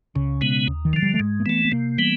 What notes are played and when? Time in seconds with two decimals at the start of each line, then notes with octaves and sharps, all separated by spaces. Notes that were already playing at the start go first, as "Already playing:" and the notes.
0.16 C#2 C#3
0.41 B2 G#3 B3
0.67 D#2
0.85 D#3
0.93 D3 F3
1.02 G3
1.14 A3
1.19 G#2 G#3
1.40 A#3
1.46 E3 A3 B3
1.65 B3
1.72 C3 A#3
1.99 E3 G3 B3